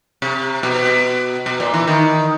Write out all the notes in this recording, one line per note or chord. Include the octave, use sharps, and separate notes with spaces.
C3
B2
B2
A#2
E3
D#3